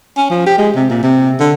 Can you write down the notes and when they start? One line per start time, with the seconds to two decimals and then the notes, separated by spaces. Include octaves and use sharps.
0.17 C#4
0.30 F3
0.46 G4
0.58 G#3
0.76 C3
0.90 A#2
1.03 C3
1.40 D3